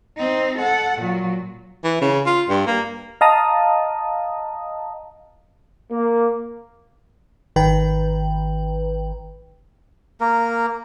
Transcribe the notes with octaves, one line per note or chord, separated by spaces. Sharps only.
C4 D#4
A4 F#5
A#2 F#3
E3
C#3
F4
G2
A#3
D#5 F5 A5 A#5 D#6
A#3
G#1 D#3 B4 G5
A#3 A#4